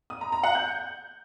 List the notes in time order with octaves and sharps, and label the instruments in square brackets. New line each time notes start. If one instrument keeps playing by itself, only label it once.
[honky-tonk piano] D#6
A#5
A#5
F#5
G6